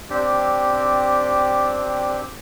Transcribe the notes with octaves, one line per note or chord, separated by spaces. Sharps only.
C4 D4 G4